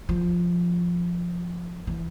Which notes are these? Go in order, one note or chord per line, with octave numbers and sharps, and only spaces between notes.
F3
E3